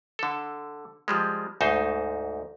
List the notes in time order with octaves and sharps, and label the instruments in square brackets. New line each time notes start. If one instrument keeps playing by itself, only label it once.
[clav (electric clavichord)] D3 A4
F3 G3 G#3
D2 G#2 D#4 C5